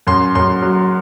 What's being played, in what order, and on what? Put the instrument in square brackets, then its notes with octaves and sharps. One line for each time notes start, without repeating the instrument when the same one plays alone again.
[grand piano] F#2 C6
F#2 C6
F#3